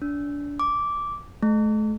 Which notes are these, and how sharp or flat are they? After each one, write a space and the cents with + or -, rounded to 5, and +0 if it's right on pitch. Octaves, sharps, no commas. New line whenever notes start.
D4 -25
D6 -10
A3 -35